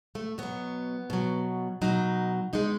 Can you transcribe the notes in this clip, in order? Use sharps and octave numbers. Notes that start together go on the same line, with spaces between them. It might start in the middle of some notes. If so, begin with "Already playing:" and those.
A3
B2 F#3 B3
B2 F#3
B2 F#3 D#4
B2 G#3 D#4